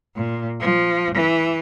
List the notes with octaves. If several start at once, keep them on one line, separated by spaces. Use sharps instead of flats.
A#2
F3
E3